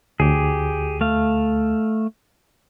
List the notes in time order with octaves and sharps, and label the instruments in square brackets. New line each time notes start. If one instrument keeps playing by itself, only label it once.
[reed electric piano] D2 [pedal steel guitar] G4 G#4
[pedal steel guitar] A3 F5